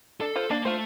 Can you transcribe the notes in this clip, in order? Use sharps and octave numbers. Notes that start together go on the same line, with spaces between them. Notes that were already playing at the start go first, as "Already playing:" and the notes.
D4 A4
F4 C5
A#3 D4
A3 F4 C5